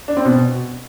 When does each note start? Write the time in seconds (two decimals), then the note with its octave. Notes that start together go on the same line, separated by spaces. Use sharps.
0.08 D4
0.17 C4
0.25 B2